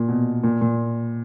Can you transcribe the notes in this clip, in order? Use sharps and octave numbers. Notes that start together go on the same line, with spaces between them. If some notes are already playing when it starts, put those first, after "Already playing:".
Already playing: A#2
B2
A#2
A#2